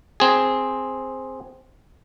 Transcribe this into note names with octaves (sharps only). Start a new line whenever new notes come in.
C4 G#4